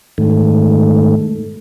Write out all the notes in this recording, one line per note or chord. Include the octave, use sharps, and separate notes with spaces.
G#2 D#3 A3